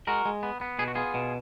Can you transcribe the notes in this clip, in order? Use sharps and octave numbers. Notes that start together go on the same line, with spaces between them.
G#3 F#4 A#4
G#3
B3
B3
B2 G#4
F#4
B3 F4 G#4
B2